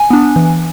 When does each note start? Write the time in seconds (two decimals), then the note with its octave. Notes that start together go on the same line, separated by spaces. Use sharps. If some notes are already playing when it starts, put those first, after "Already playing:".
Already playing: G#5
0.10 B3 D4
0.36 E3